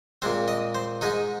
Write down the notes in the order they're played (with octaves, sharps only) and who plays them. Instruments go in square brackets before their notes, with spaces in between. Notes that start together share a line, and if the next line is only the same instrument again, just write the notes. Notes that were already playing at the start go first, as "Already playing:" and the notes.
[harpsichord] A#2 G#3 C4 C5
D#5
C5
G#2 G#3 D#4 D#5